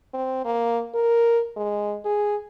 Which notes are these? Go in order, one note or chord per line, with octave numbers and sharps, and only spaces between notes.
C4
A#3
A#4
G#3
G#4